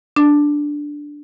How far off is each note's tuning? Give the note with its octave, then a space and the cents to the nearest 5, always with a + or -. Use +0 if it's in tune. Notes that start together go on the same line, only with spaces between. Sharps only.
D4 +0